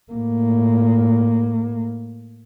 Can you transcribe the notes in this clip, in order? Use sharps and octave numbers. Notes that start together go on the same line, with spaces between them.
A2 A#3